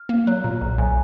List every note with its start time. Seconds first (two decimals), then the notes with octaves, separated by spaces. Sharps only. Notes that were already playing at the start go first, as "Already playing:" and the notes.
Already playing: F6
0.09 A#3
0.27 F#3 F#6
0.44 A#2 A#5
0.61 B1 A#5
0.78 B1 G#5